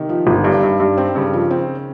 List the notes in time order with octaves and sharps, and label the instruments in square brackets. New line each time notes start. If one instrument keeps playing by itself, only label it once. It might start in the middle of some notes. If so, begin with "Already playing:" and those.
Already playing: [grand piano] C3 D#3
[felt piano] F3
G1
G2
G2
G2
C4
[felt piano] G2 [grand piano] C#3
[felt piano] F3
C4